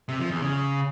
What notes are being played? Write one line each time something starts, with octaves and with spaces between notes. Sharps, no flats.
C3
F3
E2
C#3